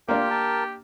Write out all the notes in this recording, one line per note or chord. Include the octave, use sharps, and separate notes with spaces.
A#3 D4 F4 G4 A#4
A#4 A5